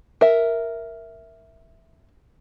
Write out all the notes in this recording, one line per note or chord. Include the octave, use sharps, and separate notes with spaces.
A#4 E5